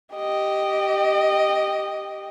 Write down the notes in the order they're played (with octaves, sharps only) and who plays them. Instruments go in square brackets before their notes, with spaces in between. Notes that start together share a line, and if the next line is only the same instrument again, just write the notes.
[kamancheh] G4 D#5